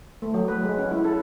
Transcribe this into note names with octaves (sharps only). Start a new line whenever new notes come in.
A3
F#3
B4
G#3
C#4
E4
A4